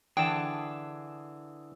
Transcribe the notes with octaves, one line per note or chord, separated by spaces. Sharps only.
D3 E3 G#4 E5 G5 A5